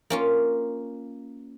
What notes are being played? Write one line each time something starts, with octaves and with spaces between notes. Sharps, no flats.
A#3 C#4 F4